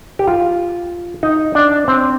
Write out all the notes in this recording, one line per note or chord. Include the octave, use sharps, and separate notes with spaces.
G4
F4
D#4
D4
C4